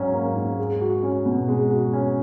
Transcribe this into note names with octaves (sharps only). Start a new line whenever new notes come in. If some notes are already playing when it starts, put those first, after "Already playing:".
Already playing: G#2 F#3 C#4
A#3
G#2
G#3
F#4
C#4
B2
G#3
F#4
C#4